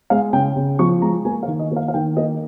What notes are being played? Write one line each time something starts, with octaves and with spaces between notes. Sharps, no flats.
G#3 F5
C#3 G5
C#3
F3 C#6
G#3 A#5
A#3 G#5
F5
D#3
D#5
A#3 F5
F5
D#3 G5
A#3 D#5